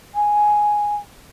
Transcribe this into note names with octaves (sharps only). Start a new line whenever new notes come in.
G#5